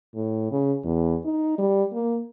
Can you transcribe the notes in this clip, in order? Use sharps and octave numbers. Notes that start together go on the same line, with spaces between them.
A2
C#3
E2
D#4
G3
A#3